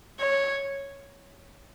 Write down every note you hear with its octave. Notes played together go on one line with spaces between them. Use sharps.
C#5